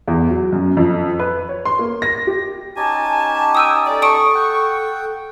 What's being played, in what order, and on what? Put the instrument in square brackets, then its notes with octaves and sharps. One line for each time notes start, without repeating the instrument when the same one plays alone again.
[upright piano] E2
F#3
F#2
F2
B4
C#5
C6
A#3
A#6
G4
[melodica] C#4 D#4 G4 [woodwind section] G#5 A5
[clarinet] G5 [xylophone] D#6 E6 D#7
[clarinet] A4 [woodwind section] D5
[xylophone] A5 D#6 D7 [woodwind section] C#6
[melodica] F#5 G5